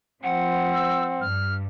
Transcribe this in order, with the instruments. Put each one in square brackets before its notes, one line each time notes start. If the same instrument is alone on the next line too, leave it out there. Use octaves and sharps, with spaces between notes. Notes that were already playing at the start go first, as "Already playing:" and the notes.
[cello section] F3 [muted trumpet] C4 [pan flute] F#5
[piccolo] E6
[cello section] G2 [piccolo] F6